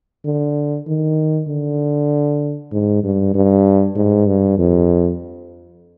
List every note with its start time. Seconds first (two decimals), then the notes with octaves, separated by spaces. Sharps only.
0.25 D3
0.87 D#3
1.48 D3
2.72 G#2
3.03 G2
3.34 G2
3.96 G#2
4.27 G2
4.58 F2